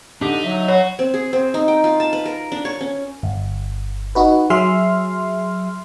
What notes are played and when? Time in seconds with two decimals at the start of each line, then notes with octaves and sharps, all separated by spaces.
0.21 D3 D4 D#4 G4
0.44 F#3 E5
0.68 F#4 C#5
0.99 C4
1.14 G#4
1.33 C4
1.54 D#4
1.68 G5
1.84 F4
2.00 A5
2.13 B4
2.26 A#4
2.52 D4
2.65 C#5
2.81 C#4
3.23 G1
4.15 D#4 F#4 B4
4.50 F#3 G#4 E5 C6 F6